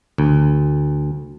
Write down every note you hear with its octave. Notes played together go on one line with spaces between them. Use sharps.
D2